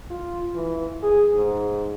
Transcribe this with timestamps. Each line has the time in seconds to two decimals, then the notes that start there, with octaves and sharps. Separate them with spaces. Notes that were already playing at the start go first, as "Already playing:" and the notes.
0.10 F4
0.55 E3
1.03 G#4
1.35 G#2